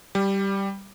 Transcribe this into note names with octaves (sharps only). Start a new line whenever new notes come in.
G3